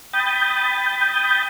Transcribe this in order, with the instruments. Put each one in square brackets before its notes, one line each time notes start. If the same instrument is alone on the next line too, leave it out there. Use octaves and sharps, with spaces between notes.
[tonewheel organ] G5 B5 D#6 G6 A6